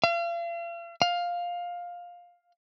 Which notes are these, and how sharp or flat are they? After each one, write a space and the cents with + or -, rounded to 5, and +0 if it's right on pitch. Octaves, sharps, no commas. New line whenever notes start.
F5 -40
F5 +10